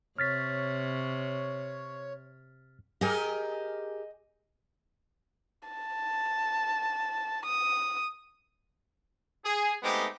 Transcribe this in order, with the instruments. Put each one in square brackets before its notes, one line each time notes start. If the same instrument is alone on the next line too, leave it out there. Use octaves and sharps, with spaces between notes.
[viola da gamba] C3 [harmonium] C#5 [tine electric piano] F6 A6 B6
[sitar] G4 G#4 A#4 [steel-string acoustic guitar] D#5 G#5
[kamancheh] A5
D#6
[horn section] G#4
G#3 A3 B3 C4 D#4 G4